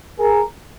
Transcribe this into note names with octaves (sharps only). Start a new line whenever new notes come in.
G#4 A#4